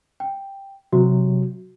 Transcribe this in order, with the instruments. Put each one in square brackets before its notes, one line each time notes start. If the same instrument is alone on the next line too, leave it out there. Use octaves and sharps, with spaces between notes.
[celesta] G5
[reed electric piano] C3 F#3 [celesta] F#4